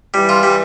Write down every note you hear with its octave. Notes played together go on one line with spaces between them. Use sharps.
E3 G3
F4
G3